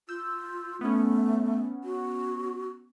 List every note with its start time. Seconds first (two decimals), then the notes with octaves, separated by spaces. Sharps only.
0.09 F4 E6 G6
0.81 A3 B3 C#4
1.84 F#4